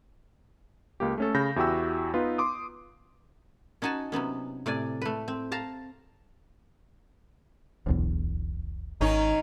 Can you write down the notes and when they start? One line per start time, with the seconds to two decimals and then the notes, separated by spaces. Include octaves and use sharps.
1.00 C#2 A#3 G4
1.18 A3 C#4 A4
1.35 C#3 B5 G6 A#6
1.56 E2 E4 F#4 G4 G5 E6
2.14 B3 D#4 F4 B4
2.38 C6 D6 D#6
3.82 C#4 D#4 F#4 G#5 A5
4.12 C3 F#3 B3 C#4
4.66 A2 C3 D5 G#5
5.02 A3 B4
5.28 C4
5.52 F5 A5 A#5
7.86 D1 B1 E2
9.01 G#1 D#3 C#4 D#4